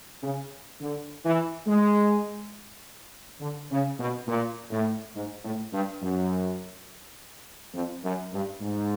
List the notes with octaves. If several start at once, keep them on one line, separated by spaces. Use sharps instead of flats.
C#3
D3
E3
G#3
D3
C#3
B2
A#2
A2
G#2
A2
G2
F#2
F2
F#2
G2
G#2